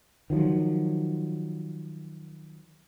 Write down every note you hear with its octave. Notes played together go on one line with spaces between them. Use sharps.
D#3 F3 F#3